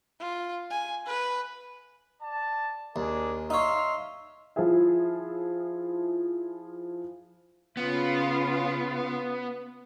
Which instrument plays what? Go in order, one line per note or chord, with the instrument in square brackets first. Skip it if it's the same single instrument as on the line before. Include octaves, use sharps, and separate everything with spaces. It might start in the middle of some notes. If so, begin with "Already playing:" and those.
[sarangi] F4
G#5
B4
[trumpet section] D5 A5
[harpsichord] D#2 [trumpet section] D4 G#4 A#4
[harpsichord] D#4 C#5 [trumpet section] E5 F5 C6
[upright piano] F3 E4 F4 G#4 E5
[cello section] C#3 F4 [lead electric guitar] B3